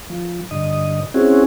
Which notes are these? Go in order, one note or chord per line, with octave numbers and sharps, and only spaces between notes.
F3
G2 D3 D#5
C4 C#4 E4 F#4 G#4